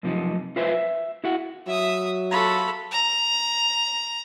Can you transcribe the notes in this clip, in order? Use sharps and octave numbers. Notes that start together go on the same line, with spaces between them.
F#2 C3 F3 D#4
F4 B4 C5 E5
E5
E4 F#4 F#5
F#3 E5 D#6
F4 F#4 A4 B5
A#5